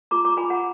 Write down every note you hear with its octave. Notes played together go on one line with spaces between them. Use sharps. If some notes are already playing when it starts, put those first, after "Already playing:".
F4 A#5 D6
A#5 D6
F4 G#5 B5
F#5 A#5